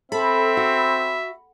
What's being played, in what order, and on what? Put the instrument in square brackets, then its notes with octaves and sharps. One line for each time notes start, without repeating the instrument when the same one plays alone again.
[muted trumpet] C4 [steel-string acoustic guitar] A4 [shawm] E5 [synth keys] B5
[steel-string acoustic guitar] F#4